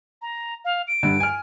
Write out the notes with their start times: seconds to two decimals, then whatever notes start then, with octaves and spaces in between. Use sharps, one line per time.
0.22 A#5
0.65 F5
0.88 D7
1.03 G2 D3
1.20 G#5 F6